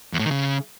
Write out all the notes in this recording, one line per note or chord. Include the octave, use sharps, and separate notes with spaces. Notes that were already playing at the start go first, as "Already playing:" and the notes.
E2
A2
D#3
C#3